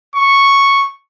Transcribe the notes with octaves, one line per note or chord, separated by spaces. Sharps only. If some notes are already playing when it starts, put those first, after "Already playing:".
C#6